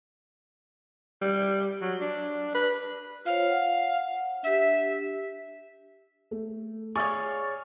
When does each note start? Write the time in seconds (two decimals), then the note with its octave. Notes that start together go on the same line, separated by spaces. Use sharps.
1.21 G3
1.82 F#3
2.01 D4
2.54 B4
3.25 F4 C5 C#5 F5
3.49 F#5
4.43 D4 G4 E5
6.31 A3
6.95 G#4 C#5 D5 F5 C#6